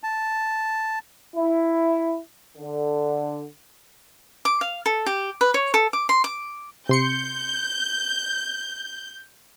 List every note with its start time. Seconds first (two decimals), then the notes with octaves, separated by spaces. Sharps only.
0.03 A5
1.35 E4
2.57 D3
4.45 D6
4.61 F5
4.86 A4
5.06 G4
5.41 B4
5.54 C#5
5.74 A4
5.93 D6
6.09 C6
6.24 D6
6.89 C3 C6 G6 C#7